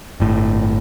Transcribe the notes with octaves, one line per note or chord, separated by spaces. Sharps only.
G1 A2